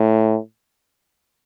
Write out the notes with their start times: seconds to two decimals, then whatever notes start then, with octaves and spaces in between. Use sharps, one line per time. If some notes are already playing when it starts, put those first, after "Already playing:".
Already playing: A2